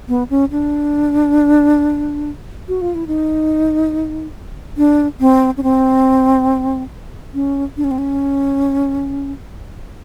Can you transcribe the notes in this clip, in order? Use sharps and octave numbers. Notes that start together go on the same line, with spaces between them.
B3
C#4
D4
F#4
F4
E4
D#4
D4
C4
C#4
C4
C#4
D4
C#4
C4
C#4